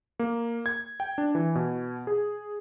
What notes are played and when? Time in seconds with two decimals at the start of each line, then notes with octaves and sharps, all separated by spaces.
0.19 A#3
0.66 G#6
1.00 G5
1.18 D4
1.35 E3
1.55 B2
2.07 G#4